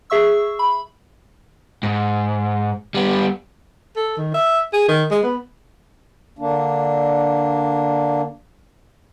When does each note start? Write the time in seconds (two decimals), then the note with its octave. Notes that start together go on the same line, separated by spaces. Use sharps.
0.10 G#4 E5 C#6 E6
0.59 B5
1.83 G#2
2.95 G3 B3
3.96 A4
4.17 D#3
4.34 E5
4.73 G#4
4.88 D#3
5.11 G#3
5.23 B3
6.39 D3 A#3 D4